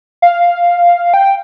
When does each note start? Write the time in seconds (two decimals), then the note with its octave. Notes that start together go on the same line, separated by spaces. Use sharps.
0.22 F5
1.14 G5